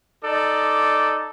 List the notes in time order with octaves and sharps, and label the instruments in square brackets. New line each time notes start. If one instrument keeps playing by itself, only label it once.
[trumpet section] D#4 A4 D5